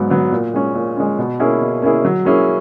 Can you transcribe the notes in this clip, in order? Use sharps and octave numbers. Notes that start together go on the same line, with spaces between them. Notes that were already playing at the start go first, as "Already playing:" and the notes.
Already playing: G#2 F#3 B3
F#3 B3
A#2
G#3 C#4
A#2
G#3 C#4
B2
A#3 C#4 E4 G#4
B2
A#3 C#4 E4 G#4
F#3
A#3 C#4 E4 G#4